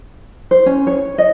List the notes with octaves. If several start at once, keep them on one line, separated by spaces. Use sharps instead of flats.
C5
C#4
C#5
D#5